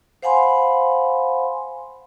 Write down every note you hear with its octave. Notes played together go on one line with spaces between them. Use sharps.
C5 F5 F#5 G#5 B5 C6